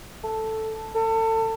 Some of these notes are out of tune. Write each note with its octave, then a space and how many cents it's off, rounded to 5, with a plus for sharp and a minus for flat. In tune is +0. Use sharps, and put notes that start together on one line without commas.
A4 +0
A4 +30